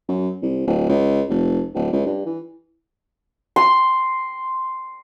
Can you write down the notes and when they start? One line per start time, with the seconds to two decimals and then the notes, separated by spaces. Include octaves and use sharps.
0.08 F#2
0.42 C2
0.67 D1
0.89 C#2
1.29 F1
1.74 D1
1.92 C#2
2.06 G2
2.26 E3
3.56 C6